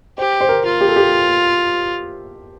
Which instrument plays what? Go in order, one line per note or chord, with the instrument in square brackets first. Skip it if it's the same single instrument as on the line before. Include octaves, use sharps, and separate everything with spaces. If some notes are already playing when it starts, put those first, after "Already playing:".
[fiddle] G4 [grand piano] C5
[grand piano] C5
A#4
[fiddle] F4
[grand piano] G4
A4
G4